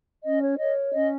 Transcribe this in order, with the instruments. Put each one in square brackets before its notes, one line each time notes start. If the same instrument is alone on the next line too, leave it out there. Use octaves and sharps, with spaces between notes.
[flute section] C#4 D#5
C#5
A#4 C#5 D#5
C#4 D#5